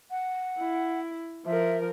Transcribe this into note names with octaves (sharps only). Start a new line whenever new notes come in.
F#5
E4
F3 A#4 E5